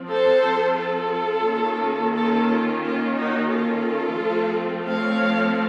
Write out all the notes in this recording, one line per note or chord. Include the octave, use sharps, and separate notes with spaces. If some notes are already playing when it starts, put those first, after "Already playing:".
Already playing: F3 C4
A4 C5
F4 A4
D#3 A#3 C#4
F4 A4
F4
F4
D#4 F#4
F4 A4
F3 A3 C4
C#5 F5